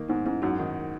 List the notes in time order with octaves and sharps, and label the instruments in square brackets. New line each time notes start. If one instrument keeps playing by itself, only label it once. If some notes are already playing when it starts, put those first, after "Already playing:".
Already playing: [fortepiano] D#3 A#3
[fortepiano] G#2 [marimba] B3 D#4
[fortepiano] G#2 [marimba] C#4 E4
[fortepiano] F#2 [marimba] D#4 F#4
[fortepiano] D#3